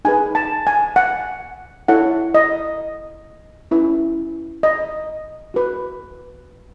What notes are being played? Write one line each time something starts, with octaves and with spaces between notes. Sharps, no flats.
D#4 G#4 B4 G#5
A5
G#5
F#5
E4 A4 C#5 F#5
D#5
C#4 E4 B4
D#5
F#4 B4